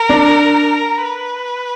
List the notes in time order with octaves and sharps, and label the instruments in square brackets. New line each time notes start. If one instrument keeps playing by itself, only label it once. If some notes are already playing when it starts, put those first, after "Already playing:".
Already playing: [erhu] A#4
[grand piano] D4
[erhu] B4